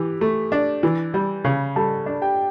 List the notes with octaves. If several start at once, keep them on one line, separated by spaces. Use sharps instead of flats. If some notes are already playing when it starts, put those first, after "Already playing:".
Already playing: E3 G4
A3
D4
E3
G3
C#3
G3 A4 A5
D4
G4 G5